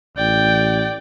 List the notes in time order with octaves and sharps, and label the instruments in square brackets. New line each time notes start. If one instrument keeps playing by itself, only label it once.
[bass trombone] A1 [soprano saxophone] D5 [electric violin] G5